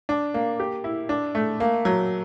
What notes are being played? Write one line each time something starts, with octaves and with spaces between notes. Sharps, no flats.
D4
A#3
G4
E4
D4
A3
A#3
F#3